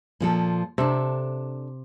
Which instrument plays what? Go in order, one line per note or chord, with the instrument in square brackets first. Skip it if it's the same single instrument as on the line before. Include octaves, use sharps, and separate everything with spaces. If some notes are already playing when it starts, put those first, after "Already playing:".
[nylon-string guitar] A#2 F3 A4
[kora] C3 [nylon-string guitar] D4 A4